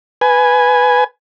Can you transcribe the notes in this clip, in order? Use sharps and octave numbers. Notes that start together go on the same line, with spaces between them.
B4 G#5